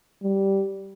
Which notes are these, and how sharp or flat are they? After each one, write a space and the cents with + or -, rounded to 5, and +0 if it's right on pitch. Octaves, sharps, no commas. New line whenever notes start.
G3 -10